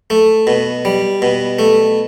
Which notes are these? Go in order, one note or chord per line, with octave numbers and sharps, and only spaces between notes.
A3
B2
G3
B2
A3